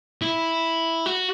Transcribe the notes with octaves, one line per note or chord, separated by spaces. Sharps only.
E4
F#4